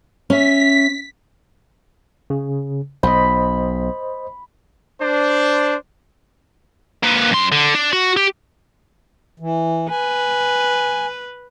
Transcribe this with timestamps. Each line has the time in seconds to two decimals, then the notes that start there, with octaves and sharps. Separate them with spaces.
0.30 C#4 E5 B6
2.30 C#3
3.03 B1 C5 D#5 B5
5.01 D4 C5
7.03 A#3 B4
7.31 F#2 C6
7.52 D3
7.75 D4
7.92 F#4
8.17 G4
9.40 E3
9.90 B4 G#5